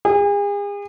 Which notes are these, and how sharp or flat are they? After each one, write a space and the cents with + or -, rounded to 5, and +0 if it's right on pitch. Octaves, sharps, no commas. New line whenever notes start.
G#4 -40